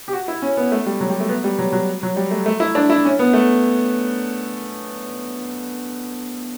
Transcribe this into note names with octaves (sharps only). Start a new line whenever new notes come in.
G4
F#4
E4
C#4
B3
A3
G3
F#3
G3
A3
B3
G3
F#3
F#3
F#3
G3
A3
A3
E4
D4
E4
C#4
B3
A3